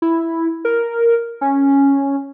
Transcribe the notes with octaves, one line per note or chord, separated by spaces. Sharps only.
E4
A#4
C#4